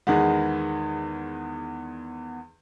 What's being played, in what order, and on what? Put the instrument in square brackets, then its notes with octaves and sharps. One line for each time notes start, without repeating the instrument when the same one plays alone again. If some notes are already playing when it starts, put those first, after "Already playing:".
[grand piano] E2 D#3 G#3 B3